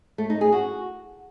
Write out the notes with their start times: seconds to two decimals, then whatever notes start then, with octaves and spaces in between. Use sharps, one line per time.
0.18 A3
0.30 D#4
0.41 G#4
0.52 F#4